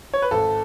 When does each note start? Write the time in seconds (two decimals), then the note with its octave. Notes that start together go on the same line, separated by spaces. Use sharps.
0.14 C#5
0.22 B4
0.31 G#1 A4